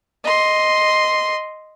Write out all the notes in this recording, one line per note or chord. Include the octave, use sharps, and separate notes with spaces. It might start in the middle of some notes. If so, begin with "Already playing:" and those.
D#5 C6